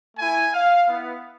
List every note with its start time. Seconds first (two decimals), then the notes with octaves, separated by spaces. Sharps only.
0.17 A3 E4 G#5
0.54 F5
0.88 B3 E4